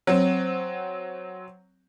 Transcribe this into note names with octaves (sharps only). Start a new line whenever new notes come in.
F#3 C4